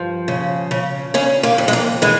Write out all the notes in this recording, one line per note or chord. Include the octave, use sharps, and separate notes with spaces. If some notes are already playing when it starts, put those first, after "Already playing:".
Already playing: G2 F3
C#3
C#3
C#3 C#4
A#3
F2
G#3
A#3
E3 G#3